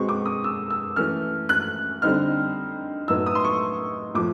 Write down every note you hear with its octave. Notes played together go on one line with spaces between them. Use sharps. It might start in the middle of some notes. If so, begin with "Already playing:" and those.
Already playing: B2 G#3 C4 C#6
D6
D#6
E6
E6
E3 A3 C#4 F6
F#6
D3 G3 C4 D#4 F6
A2 F#3 B3 D#4 E6
D#6
C6
C#6
A2 F3 D6